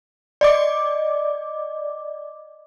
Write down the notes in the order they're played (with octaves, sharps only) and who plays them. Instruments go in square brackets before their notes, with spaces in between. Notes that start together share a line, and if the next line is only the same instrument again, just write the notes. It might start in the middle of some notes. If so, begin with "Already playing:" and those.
[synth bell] D5 D#5 D6